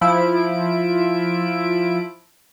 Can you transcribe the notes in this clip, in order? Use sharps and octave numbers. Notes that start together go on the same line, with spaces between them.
F3 E4 D7